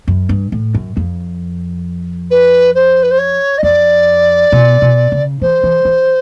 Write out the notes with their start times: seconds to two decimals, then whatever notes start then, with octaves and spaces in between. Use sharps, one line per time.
0.08 F#2
0.29 G2
0.52 A2
0.74 F#2
0.97 F2
2.30 B4
2.75 C5
3.03 B4
3.11 C5
3.18 C#5
3.58 D#5
3.63 F2 D5
4.52 B2
4.82 B2
5.12 C#3
5.41 E3 C5
5.63 E3
5.85 E3